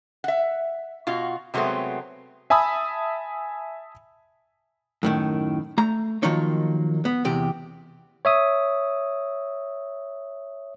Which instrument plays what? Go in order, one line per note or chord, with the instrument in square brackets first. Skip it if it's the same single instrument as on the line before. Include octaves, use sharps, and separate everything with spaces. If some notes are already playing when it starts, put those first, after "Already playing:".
[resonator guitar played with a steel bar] E5 F#5
B2 F4 F#4
C3 F#3 G#3 A3 B3 C4
[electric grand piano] E5 G#5 A5 B5 D#6 E6
[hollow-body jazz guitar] F#2 A2 D#3
A3 A#5
D#3 F3 F#3 A#3 D#4 C#5
B3
E2 C3 G4
[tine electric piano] C#5 E5 D#6